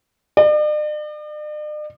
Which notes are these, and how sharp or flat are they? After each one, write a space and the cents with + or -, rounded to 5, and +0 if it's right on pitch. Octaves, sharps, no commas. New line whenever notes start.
D5 +45